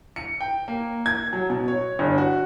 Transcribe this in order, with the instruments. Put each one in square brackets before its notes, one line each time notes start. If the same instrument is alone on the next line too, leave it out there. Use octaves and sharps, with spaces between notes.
[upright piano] C#7
G5
A#3
G#6
F#3
B2
C#5
G1
F#4